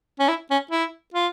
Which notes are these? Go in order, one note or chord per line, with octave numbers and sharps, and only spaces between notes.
C#4
E4
C#4
E4
F4